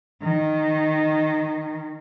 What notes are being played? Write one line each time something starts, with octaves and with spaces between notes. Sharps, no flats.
D#3